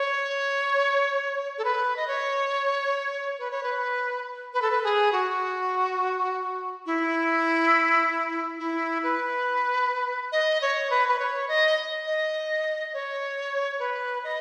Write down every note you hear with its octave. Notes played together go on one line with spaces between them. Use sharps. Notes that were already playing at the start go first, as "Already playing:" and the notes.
Already playing: C#5
A4
B4
D#5
C#5
B4
C#5
B4
B4
A4
B4
G#4
F#4
E4
E4
B4
D#5
C#5
B4
B4
C#5
D#5
D#5
C#5
B4
D#5